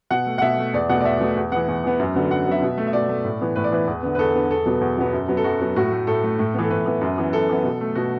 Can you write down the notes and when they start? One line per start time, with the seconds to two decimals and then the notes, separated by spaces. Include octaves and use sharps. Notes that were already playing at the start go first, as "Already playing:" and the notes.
0.11 B2 F#5
0.26 A3
0.38 F#5
0.41 B2 E5
0.58 A3
0.74 E2 D5
0.89 B2 A3 F#5
1.01 D5
1.04 E2 E5
1.20 B2 A3
1.36 E2
1.52 E3 B3 F#5
1.68 E2
1.84 E3 B3
2.00 F#2
2.15 D3 F#3 B3
2.30 F#2 F#5
2.47 D3 F#3 B3 E5
2.62 B2
2.78 A3
2.87 E5
2.93 B2 D5
3.09 A3
3.25 A2
3.41 E3 B3
3.56 A2 B4
3.64 D5
3.72 E3 B3 B4
3.87 E2
4.03 D3 B3
4.15 B4
4.19 E2 A4
4.35 D3 B3
4.50 E2 A4
4.66 B2 F#3 B3
4.81 E2
4.97 B2 F#3 B3
5.13 F#2
5.28 F#3 B3
5.37 A4
5.44 F#2 F#4
5.61 F#3 B3
5.76 A2 F#4
5.92 A3
6.07 A2 A4
6.24 A3
6.39 A2
6.54 E3 B3
6.64 A4
6.70 A2 B4
6.86 E3 B3
7.01 F#2
7.18 E3 B3
7.33 F#2 A4
7.49 E3 B3
7.64 B2
7.81 A3
7.95 B2 F#4